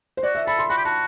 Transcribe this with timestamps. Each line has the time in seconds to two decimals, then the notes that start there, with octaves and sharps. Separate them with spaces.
0.17 C5
0.23 F#4 D5
0.35 E5
0.47 A4 B5
0.59 C6
0.70 F#4 B5
0.77 G4
0.85 F#4 A5